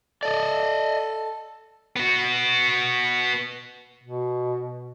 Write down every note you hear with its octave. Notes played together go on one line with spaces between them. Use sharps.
A4 D5 D#5
B3 F#4
B2